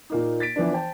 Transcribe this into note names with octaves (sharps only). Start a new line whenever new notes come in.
A#2 A#3 D#4
A6 B6 D7
E3 F3 B3 D4
C5 G5 A5